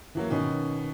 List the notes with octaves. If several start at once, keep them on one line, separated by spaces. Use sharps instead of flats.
E3 F#3 A#3
B2 D#3 C#4